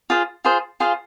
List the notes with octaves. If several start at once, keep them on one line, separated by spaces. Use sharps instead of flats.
F4 G#4 C5
F4 G#4 C5
F4 G#4 C5 F5